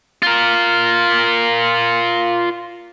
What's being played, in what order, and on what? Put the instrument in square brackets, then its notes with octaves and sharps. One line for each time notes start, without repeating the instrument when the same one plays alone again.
[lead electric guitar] F4 A#4